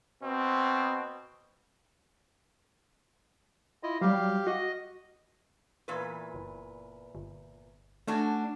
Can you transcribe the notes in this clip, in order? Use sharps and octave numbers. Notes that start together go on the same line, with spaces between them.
B2 C4
E4 F4 D#5
F#3 G3 G4 F5
F#4 D#5
E2 A#2 B4
F#1
G1
A3 C#4 D4 F#4